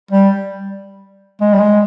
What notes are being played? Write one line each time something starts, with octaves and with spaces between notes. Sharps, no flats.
G3
G#3
G3
G#3